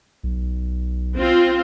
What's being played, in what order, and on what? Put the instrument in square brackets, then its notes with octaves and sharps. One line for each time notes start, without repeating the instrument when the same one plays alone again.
[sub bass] B1
[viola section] C4 F4